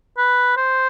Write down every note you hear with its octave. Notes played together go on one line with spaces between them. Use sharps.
B4
C5